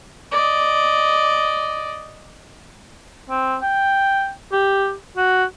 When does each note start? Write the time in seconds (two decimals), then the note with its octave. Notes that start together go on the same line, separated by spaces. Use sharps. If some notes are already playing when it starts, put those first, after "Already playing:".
0.32 D5 D#5
3.30 C4
3.62 G5
4.52 G4
5.17 F#4